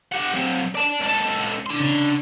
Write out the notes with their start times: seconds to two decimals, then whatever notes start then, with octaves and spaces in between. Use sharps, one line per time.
0.12 G4 F#5
0.34 F#3 C4
0.75 D5 A5
1.00 C#2 A4
1.66 D4 C6
1.80 C#3